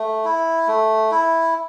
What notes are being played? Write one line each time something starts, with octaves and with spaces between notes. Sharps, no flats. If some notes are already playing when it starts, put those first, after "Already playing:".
Already playing: A3
E4
A3
E4